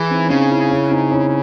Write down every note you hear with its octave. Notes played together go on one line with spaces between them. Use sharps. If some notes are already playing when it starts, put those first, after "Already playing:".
Already playing: E3 E4 G#4
C4 D#4
C#4
C#3 C4 D#4
C#4 E4
C#4 E4
C4 D#4
C#4 E4